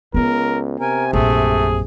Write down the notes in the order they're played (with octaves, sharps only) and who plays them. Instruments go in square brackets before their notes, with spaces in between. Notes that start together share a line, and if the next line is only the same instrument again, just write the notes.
[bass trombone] C#2 [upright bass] B3 C#4 [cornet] A#4
[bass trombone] C3 [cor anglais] A#4 [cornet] G#5
[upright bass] A#1 F#2 [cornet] A3 [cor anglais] G#4